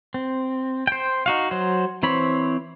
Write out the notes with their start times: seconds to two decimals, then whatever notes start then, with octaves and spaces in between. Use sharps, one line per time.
0.14 C4
0.87 C5 G5
1.26 D#4 F#4 F5
1.51 F#3 C5
2.03 E3 C4 C5 C#5 B5